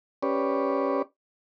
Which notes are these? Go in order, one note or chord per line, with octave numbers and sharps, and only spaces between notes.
C#4 G4 B4 C#5 D5